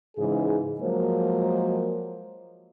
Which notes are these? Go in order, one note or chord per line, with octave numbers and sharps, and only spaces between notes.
G#2 C#3 E3 G#4
F3 F#3 G#3 A#3 A#4 C5